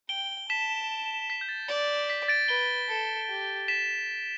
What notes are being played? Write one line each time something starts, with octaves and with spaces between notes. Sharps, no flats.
G5 D7 G7
A5 B6 E7
B6
G6
A6
D5
B6
A6 D7
B4 D7 G7
A4
G4
B6 E7